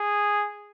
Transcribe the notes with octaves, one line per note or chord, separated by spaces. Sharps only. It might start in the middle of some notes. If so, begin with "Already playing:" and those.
Already playing: G#4